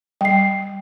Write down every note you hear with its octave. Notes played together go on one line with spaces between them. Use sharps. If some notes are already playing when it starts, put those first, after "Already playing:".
G3 G5 C7